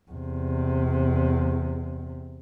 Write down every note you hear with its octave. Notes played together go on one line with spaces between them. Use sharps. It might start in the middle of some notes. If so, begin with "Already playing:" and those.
E2 C3